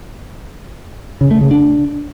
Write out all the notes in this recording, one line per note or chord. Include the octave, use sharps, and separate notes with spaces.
C#3
A3
C#3
D4